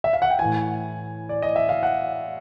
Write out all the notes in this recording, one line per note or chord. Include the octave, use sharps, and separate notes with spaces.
E5
F5
F#5
G5
A2 E3 G#5
D5
D#5
E5
F5
F#5